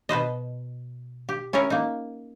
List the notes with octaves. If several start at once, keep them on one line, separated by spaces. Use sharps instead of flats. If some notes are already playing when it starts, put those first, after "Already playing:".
B2 B4 C5 D#5
G4
C#4 E4 G#4 A#4 C#5
A#3 D#4